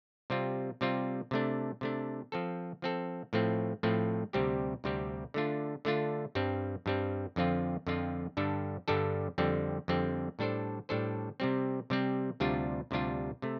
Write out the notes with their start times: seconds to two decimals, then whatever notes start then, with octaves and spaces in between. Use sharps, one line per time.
0.30 C3 G3 C4 F4
0.81 C3 G3 C4 F4
1.31 C3 A3 D4
1.81 C3 A3 D4
2.32 F3 C4 A4
2.82 F3 C4 A4
3.33 A2 F3 A3 C4
3.83 A2 F3 A3 C4
4.33 D2 C3 G3 C4 G4
4.84 D2 C3 G3 C4 G4
5.34 D3 A3 D4 F4
5.85 D3 A3 D4 F4
6.35 G2 G3 C4
6.86 G2 G3 C4
7.36 F2 D3 F3 C4 F4
7.87 F2 D3 F3 C4 F4
8.37 G2 D3 G3 D4 A4
8.88 G2 D3 G3 D4 A4
9.38 F2 D3 G3 C4
9.88 F2 D3 G3 C4
10.39 A2 G3 D4 A4 C5
10.89 A2 G3 D4 A4 C5
11.40 C3 G3 C4
11.90 C3 G3 C4
12.40 D2 C3 G3 D4 F4
12.91 D2 C3 G3 D4 F4
13.42 C3 A3